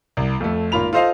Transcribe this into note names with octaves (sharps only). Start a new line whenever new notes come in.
C2
F2 A3
G#1 A#3 F4 B5 F7
F4 A4 C5 D#5 F5